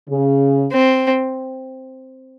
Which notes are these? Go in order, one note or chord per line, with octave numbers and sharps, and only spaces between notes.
C#3
C4